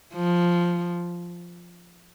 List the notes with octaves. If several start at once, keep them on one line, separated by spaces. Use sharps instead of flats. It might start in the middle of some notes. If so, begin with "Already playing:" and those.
F3